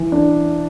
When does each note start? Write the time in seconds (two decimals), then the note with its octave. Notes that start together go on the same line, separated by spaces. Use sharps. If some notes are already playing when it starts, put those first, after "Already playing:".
Already playing: E3
0.12 D4